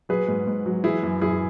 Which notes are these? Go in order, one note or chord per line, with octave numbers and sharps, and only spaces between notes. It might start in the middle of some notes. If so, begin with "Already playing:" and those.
F#3 G#4 B4
G#2
G#2
F#3
E3 E4 G#4
F#2
F#2 E4 G#4